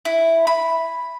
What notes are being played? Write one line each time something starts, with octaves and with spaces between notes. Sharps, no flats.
E4
B5